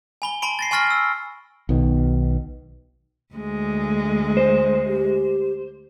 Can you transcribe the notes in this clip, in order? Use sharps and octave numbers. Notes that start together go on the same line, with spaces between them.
G#5 B5 G7
A5 B5 C6 D7
A6 A#6 C7
G#5 C6 C#6 F6 A6 A#6
E6
B1 B2 D#3
D2 G#3
C5
G4